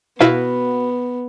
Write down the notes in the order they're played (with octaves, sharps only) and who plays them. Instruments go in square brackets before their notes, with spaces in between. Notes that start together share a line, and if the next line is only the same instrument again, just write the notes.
[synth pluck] B2 E4 [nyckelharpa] B3 [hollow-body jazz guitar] F#4 B4 F5